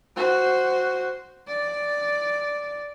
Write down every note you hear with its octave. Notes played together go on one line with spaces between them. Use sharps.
F#4 C5
D5